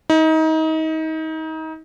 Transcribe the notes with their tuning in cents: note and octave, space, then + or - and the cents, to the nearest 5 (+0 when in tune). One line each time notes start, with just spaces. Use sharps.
D#4 +30